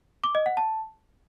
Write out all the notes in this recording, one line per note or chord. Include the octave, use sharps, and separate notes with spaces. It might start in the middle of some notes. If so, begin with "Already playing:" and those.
D6
D#5
F#5
A5